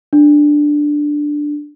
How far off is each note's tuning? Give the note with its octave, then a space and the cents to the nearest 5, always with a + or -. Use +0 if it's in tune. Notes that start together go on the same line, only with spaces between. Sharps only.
D4 +5